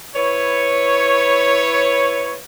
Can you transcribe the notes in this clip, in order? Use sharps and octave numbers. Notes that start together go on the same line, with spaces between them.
E4 B4 C#5